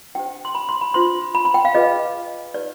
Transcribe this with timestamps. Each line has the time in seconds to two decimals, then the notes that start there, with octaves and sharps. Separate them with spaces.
0.15 D4 G4 C5 G5
0.45 C6
0.55 B5
0.69 C6
0.81 B5
0.94 D4 F4 C5 C6
1.35 B5
1.45 B5
1.54 G5
1.65 F5
1.75 F4 G#4 B4 D#5
2.54 D#4 G4 B4 D5